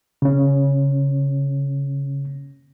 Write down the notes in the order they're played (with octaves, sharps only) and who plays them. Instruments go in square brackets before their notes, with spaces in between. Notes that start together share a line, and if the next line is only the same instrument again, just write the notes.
[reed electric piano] C#3 C#4